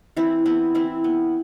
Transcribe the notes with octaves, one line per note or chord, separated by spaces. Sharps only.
E3 C4 E4
B3 C4 E4
E3 C4 E4
B3